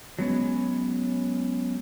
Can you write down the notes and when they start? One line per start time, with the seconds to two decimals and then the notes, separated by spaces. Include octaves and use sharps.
0.19 F#3 G#3 B3 C#4